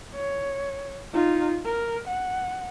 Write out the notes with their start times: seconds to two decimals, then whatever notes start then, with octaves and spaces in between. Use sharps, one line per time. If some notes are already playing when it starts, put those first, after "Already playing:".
0.15 C#5
1.13 D#4 F4
1.65 A#4
2.08 F#5